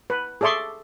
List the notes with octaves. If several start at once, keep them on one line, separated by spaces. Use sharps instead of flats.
B4
G#4 A4 D5 E5 C6 C#6